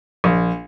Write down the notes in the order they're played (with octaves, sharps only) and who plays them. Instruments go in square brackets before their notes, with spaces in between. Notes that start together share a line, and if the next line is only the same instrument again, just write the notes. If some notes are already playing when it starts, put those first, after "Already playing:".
[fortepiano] A#1